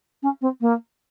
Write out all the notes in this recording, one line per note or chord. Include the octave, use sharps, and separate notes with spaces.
C#4
C4
A#3